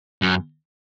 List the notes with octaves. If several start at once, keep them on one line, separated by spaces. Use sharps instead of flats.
F#2